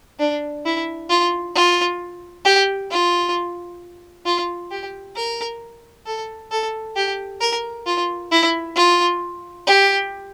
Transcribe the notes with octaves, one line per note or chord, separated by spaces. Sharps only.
D4
E4
F4
F4
G4
F4
F4
G4
A#4
A4
A4
G4
A#4
F4
E4
F4
G4